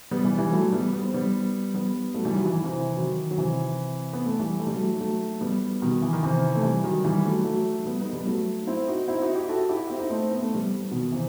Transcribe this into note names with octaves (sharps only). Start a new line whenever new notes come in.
G3 B3
E3 G3
E3 G3
F#3 A3
G3 B3
B3
C4
G3 B3
G3 B3
F#3 A3
E3 G3
D#3 F#3
E3
D#3
C3 E3
D#3 F#3
F#3
C3 E3
B3
A3
E3 G3
A3
G3
F#3 A3
F#3 A3
G3 B3
B2 D#3
E3
D#3
C3 E3
A3
E3 G3
D#3 F#3
E3 G3
F#3 A3
F#3 A3
G3 B3
B3 D#4
G3 B3
F#3 A3
C4 E4
D#4 F#4
C4 E4
D#4 F#4
E4 G4
F#4 A4
E4 G4
C4 E4
D#4
A3 C4
B3
A3
G3 B3
B2 D#3
C3 E3